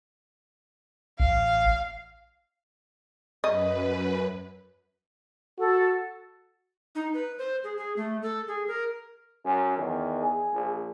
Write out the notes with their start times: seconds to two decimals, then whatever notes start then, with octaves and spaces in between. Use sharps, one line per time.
1.20 A1 F5
3.44 F#2 B4 D#5
5.59 F#4 A4
6.95 D#4
7.14 B4
7.38 C5
7.64 G#4
7.77 G#4
7.96 A3
8.22 A4
8.48 G#4
8.68 A#4
9.45 F#2 C#4
9.78 E2 D#3
10.21 G#4
10.53 A#1